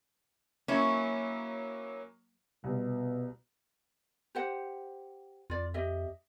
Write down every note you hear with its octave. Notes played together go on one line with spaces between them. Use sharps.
F#3 A#3 C#4 E4
C2 B2
G4 C5 F#5
F2 F4 D5
G4 D#5 E5